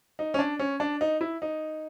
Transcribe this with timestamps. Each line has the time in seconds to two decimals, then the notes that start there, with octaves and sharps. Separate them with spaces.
0.19 D#4
0.34 C#4
0.39 D4
0.59 C#4
0.80 D4
1.01 D#4
1.21 E4
1.42 D#4